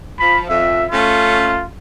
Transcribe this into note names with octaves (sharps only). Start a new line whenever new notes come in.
F3 B5
F2 E5
A3 C#4 F4